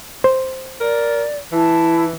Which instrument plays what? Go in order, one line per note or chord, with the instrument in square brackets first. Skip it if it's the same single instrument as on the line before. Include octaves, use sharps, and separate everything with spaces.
[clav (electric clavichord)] C5
[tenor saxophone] A#4 [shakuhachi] D5
[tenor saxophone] E3 [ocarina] E4 [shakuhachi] A5